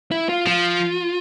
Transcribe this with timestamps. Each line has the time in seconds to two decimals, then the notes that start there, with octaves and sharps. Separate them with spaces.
0.11 E4
0.29 F4
0.46 F3 F4